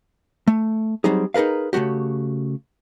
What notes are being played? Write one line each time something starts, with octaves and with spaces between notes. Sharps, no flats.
A3
F#3 G3 C4 D#4 G#4
D#4 G#4 A#4 B4 F5
C#3 A3 A#3 F#4 G4